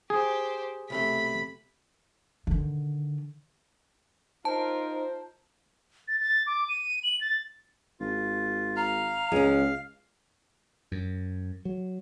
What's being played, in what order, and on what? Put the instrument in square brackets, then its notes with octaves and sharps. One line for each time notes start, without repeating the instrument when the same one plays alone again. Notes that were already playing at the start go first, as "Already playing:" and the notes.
[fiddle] G4 C5 [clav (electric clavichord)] G#4
[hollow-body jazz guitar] B1 C3 A3 [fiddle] B5
[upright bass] D3 D#3
[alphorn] D#4 [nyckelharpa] F4 A#4 [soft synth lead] C5 [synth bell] A5
[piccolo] A6
A6
D6
D#7
F#7
A6
[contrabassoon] G#1 [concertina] F4
[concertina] F5 F6 [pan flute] A#5
[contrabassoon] C#2 [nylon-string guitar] G#3 C#4
[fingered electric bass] F#2
F#3